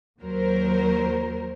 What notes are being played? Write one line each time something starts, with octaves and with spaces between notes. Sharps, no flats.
D#2 F#3 A#4 C5